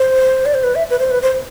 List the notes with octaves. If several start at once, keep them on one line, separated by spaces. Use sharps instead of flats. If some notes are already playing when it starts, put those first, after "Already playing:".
Already playing: C5
D5
C5
B4
E5
B4
C5
B4
C5